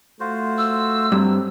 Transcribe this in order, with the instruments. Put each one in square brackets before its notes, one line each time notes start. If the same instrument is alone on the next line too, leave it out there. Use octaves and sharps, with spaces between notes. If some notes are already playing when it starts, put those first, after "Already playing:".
[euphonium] A3 [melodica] F4 F#4 C5
[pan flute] E6
[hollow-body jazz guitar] G2 [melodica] F#3 [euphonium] C4